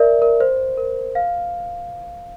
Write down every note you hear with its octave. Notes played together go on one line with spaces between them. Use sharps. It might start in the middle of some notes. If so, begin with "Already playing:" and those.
Already playing: A#4 D5 E5
A#4
C5
A#4
F5